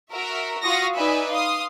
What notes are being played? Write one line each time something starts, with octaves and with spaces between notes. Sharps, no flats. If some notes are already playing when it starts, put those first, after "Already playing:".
F#4 A#4 E5
F4 F#4 F5 C#6 D#6 A#6
D#4 B4 D5 E5 G#5
F5 C6 D#6